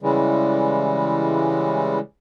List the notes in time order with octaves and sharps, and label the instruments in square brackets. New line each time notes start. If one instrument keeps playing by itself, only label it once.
[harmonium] C#3 E3 G3 G#3